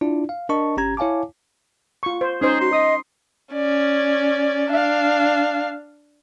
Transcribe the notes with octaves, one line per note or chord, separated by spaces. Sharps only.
D4 E4 F4 D5
F5
D4 A#4 D#5 A5 C#6
G1 C#4 G4 A#5 G#6
E4 C#5 F5 G#5 A5 D6
F4 C#6
C5
C#4 D#4 G#4 C5
F#4 C6
D#5 D#6
C#4 D5
D4 F5